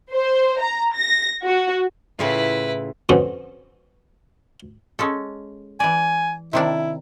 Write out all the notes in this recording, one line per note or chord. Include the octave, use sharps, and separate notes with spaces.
C5
A#5
A#6
F#4
A2 C#3 E4 F4 B4
F2 B2 D3 C4 C#4
G#3 C#4 A4
E3 D5 G#5
C3 D#3 D4 E4